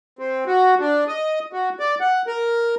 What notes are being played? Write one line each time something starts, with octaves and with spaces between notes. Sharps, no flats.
C4
F#4
D4
D#5
F#4
D5
F#5
A#4